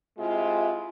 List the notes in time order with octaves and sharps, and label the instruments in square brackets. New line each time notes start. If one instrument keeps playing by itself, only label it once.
[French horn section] C3 G#3 E4 F4